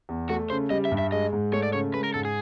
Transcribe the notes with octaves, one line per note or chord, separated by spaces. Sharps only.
E2
A3 F#4
C#3 C5
G3 D#5
E5
G2
E5
G#3 D#5
G#2
A3 C#5
D5
C#3 C#5
G#3 B4
A#4
G#2 A4
G#4